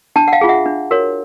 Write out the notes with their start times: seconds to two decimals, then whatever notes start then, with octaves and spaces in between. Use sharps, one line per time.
0.16 D4 G5 A5
0.28 F#5
0.32 F5 G5
0.41 F4 G#4
0.49 E5 F#5
0.66 D4
0.91 F#4 A#4 C#5